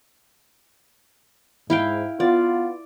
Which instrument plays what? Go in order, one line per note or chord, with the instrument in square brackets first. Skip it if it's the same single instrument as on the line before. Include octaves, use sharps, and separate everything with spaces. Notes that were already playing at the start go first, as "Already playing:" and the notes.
[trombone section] G#2 [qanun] E4 F5 G5
[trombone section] B3 F4 [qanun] D5